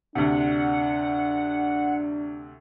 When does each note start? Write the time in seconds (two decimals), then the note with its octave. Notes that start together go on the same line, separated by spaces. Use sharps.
0.15 D2 C3 D4 F#5